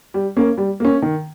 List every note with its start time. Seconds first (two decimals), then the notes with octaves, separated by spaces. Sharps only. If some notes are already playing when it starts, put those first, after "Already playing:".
0.14 G3
0.37 A#3 C#4
0.58 G3
0.80 A#3 C#4
1.02 D#3